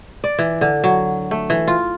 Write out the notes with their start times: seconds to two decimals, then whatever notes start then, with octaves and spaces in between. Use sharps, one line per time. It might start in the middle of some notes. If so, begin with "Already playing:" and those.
0.24 D5
0.39 E3
0.61 D3
0.84 F#3
1.31 A3
1.50 E3
1.68 F4